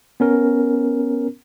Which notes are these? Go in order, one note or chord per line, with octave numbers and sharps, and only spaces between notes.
B3 C#4 A#4